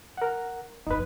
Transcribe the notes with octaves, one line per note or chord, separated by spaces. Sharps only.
A#4 F#5
F#1 F2 D#4 B4